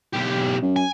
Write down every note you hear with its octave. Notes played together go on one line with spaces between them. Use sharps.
B1 G4
F#2
G#5